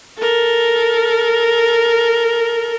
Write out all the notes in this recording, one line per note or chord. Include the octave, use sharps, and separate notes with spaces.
A4 A#4